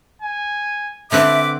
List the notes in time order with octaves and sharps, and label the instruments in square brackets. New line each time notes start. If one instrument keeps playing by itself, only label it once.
[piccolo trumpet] G#5
[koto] D3 C4 B4 [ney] E5 [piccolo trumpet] D6